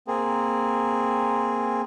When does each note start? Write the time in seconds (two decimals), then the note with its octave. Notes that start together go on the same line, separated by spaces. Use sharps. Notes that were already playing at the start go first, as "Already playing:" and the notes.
0.08 A#3 C4 G#4